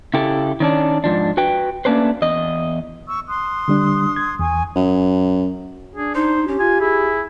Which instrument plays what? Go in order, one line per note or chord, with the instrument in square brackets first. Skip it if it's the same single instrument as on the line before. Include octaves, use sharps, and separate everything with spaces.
[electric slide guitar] C#3 E4 G4 A4
D#3 C#4 D4
G#2 F3 D4
F#4 B4 G5
A3 A#3 C#4 D4 B4 C5
E2 D#5
[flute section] C#6 E6
C6 D#6 F#6
[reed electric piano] D3 G3 D4
G#6
[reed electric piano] E2 [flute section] G#5 C#6 D#6
[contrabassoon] F#2
[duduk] D4 [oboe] G#4
[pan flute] D#4 [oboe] C5
[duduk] C#4 [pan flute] G4
[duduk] F4 [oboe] G#5
[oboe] E4 [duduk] G#4